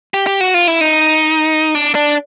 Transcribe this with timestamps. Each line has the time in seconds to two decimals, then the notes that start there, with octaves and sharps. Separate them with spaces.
0.14 G4
0.27 G4
0.41 F#4
0.54 F4
0.67 E4
0.81 D#4
1.75 D4
1.95 D4